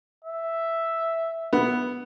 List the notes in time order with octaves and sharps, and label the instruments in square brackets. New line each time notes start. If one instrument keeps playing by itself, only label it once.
[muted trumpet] E5
[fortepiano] B3